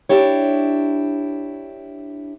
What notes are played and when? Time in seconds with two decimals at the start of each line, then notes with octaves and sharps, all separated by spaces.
0.09 D4 E4 G4 C#5